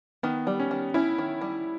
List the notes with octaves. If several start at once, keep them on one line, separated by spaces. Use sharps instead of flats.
D#3 B3
G3
C#4
D#3
C#4 E4
D#3
G3